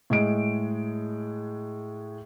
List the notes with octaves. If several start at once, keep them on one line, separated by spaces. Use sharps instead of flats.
A2 G#3 D7